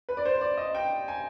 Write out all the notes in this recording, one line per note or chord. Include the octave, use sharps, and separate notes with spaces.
B4
D5
C5
D5
D#5
G5
G#5